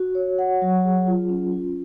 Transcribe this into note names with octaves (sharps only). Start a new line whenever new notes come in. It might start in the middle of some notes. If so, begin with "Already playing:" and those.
Already playing: F#4
C#5
F#5
F#3
G#4
F4
C#4
F4